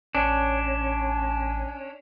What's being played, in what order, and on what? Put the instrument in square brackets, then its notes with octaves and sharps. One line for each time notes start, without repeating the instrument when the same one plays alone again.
[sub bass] A1 [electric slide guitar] C#4 D4